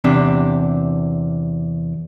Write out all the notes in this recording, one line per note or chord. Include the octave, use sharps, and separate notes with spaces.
E2 C3 D4